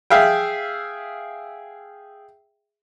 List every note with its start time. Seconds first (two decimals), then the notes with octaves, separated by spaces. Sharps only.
0.10 G#4 E5 F5 G5